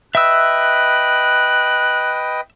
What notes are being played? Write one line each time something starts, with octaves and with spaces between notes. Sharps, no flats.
B4 D#5 E5 G5 E6 F#6